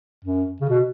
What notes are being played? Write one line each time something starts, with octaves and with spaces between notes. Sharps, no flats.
F#2
C#3
B2